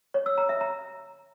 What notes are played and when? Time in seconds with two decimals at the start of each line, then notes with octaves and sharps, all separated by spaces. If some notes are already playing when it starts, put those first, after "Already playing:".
0.14 C#5
0.26 E6
0.38 A#5
0.49 E5
0.61 A#5